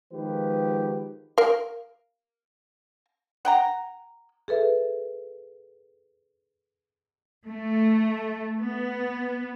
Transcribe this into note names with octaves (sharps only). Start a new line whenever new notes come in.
D#3 F3 G#3 B3 G4 B4
A#4 F5
F#5 G5 A#5
G#4 A4 B4 E5
A3
B3